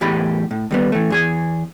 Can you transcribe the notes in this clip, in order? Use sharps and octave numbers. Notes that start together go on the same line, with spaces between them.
E2 A2 G4 D#5 B5
A2
D#2 G3 B3
E3 A3
E2 G#4 G#5